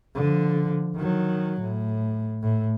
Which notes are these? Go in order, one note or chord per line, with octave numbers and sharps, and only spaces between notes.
D3 F3
D#3 F#3
A2
A2